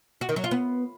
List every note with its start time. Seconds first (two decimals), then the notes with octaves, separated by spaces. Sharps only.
0.21 F#4
0.29 D#3
0.36 F#3
0.44 F4
0.51 B3